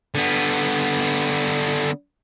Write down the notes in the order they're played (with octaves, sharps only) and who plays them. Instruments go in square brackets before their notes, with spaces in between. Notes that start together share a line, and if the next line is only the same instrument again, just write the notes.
[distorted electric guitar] D3 B3